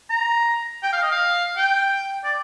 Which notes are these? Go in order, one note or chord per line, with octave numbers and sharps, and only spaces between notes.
A#5
G5
F5
D#5
F5
G5
D5